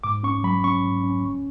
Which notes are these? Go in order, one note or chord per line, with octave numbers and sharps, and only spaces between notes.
G#2 D6
C#4 C#6
F#3 B5
C#4 C#6
G#2
C#4
D2